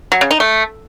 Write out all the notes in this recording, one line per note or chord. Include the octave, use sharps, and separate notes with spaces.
F#3
C#3
D#4
A3